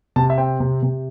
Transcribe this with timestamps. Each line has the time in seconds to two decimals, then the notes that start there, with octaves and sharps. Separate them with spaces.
0.16 C3 A5
0.30 E5
0.38 C4 G5
0.60 C3
0.83 C3